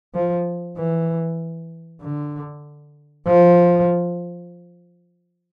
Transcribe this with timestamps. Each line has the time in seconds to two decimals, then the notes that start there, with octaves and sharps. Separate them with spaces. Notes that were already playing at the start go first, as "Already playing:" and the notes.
0.14 F3
0.77 E3
2.01 D3
3.27 F3